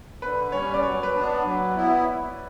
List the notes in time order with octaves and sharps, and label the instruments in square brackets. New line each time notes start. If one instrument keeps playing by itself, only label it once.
[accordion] D3 [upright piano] B4
[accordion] G3 C#4 [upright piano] C#5
[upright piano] D5
[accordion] F#3 [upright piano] C#5
[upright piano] B4
[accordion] B3 D4
F#3
B3 E4